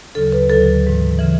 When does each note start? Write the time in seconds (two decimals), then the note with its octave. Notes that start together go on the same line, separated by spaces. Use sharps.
0.15 D2 C#3 F#3 A4
0.32 B4
0.49 D2 D3 F#3 A4
0.83 G#2 E3
1.19 C#3 E3